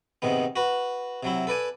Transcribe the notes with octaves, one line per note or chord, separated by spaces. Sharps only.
G#2 C3 D#3 B3
F#4 B4
C3 F#3 E4
A4 B4 D5 G#5